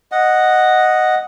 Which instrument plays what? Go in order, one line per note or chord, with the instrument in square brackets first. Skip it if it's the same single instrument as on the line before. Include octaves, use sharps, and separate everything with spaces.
[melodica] D#5 F#5